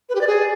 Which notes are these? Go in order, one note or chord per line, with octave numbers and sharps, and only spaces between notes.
B4
G4
D5
G#4